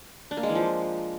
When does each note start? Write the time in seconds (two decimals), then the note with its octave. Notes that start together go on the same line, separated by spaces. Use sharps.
0.31 D4
0.37 A#3
0.43 G#3
0.49 E3
0.55 F3